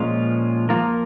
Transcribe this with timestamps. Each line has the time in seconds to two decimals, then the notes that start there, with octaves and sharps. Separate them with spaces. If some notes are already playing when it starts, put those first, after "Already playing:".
Already playing: A#2 F3 G#3 C#4 F4
0.69 F3 A#3 F4 A#4